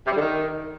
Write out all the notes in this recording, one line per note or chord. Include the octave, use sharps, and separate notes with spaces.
C3
G3
D3
D#3